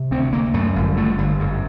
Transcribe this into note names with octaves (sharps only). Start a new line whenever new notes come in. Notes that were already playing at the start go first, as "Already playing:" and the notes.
Already playing: C3
D2 C4
D2 A#3
F#2 A3
G1
D3 A3
G1
F#2